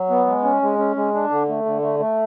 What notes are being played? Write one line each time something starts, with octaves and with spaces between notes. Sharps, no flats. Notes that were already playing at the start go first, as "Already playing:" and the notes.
Already playing: F#3
B3
G#3
C#4
G#3
C#4
G#3
D4
D3
A3
D3
A3
A3